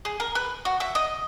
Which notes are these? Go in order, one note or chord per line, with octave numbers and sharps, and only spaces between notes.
G#4
A#4
B4
F#4
E5
D#5